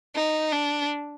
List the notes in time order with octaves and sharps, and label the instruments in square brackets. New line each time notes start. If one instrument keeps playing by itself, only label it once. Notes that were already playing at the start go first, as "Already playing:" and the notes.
[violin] D#4
D4